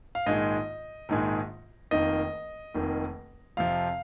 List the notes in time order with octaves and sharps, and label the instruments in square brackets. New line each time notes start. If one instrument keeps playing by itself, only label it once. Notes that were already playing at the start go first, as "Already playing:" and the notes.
[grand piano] F5
A#1 G#2 D#3 G#3 D#5
A#1 G#2 D#3 G#3
F1 F2 D#3 A#3 D#5
F1 F2 D#3 A#3
F2 C3 F3 F5